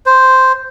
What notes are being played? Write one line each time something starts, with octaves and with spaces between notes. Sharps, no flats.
C5